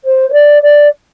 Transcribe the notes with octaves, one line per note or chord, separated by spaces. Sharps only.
C5
C5
D5
D5